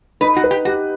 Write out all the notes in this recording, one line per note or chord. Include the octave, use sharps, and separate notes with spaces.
D#4 B4
F#4
B4
G4
F#4 G4